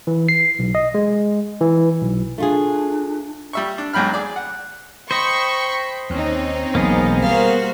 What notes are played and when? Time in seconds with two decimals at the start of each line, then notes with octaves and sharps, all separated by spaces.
0.07 E3
0.29 C7
0.59 B1
0.75 D#5
0.94 G#3
1.61 E3
2.01 B1
2.38 A3 D4 F4 G#4
3.53 G3 E5 C#6
3.78 D4
3.93 E2 G#2 F#3 G5 B5 F6
4.14 G#4 D5
4.36 F#5
5.11 C5 D#5 G5 B5 C#6
6.10 D#2 C4 C#4 D#4
6.75 E1 B1 A#3 B3 G#4
7.22 G3 F#4 A#4 C5 F5